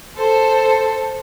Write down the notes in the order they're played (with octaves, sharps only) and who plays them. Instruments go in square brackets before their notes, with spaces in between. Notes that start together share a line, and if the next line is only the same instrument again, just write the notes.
[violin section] A4 C5